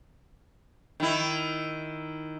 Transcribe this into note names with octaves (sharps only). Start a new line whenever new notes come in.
D#3 E4